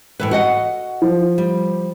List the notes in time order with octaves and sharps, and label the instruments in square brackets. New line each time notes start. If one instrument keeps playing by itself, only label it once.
[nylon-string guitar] A2 E3 B4
F#4 D#5 F#5
[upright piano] F3
[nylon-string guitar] G3